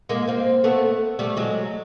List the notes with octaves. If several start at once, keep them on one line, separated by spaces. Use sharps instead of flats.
G#3 A#3
A#3 C4
A3 B3
G3 A3
F#3 G#3